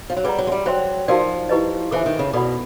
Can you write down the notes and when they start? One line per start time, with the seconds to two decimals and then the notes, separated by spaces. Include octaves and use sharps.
0.10 F3
0.17 F#3
0.24 G3 G#4 B4 D5 F#5 A#5
0.38 F#3
0.47 G#3
0.52 G3
0.66 F#3 C5 E5 G5 C6
1.08 F3 D#4 F#4 A#4 D5
1.49 E4 G4 B4 D#5
1.91 E3 A4 C5 E5 G#5
2.06 D#3
2.19 C#3
2.33 B2 A4 D5 F#5 B5